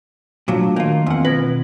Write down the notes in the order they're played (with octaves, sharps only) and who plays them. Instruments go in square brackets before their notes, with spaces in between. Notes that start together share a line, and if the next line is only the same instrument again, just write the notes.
[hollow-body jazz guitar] A#2 F#3 [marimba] A3 D4
[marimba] D#3 [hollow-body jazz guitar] A#3 F4
[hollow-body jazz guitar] E2 F#5 [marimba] C4 F4
[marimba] B2 G#6 A#6 [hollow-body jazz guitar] B4